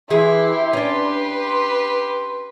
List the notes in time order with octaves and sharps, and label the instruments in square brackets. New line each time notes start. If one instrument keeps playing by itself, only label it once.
[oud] E3 G#4 [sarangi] E4 [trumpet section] G4 C6
[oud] C#4 D4 [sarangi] B4